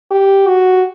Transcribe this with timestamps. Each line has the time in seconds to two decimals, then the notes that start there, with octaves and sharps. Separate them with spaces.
0.11 G4
0.47 F#4